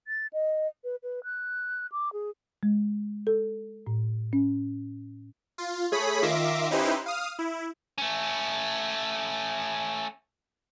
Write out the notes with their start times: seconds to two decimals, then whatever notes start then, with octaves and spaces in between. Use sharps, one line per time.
0.07 A6
0.33 D#5
0.84 B4
1.03 B4
1.24 F#6
1.92 D6
2.13 G#4
2.63 G#3
3.27 A4
3.87 A2
4.33 C#4
5.58 F4
5.92 A3 G#4 C#5 B5 D#6 B6
6.22 D#3 F4 E5 D6 A#6 C7
6.71 C#4 D#4 E4 G4 B4 C5
7.06 F5 D#6 F6
7.39 E4
7.98 A3 C#4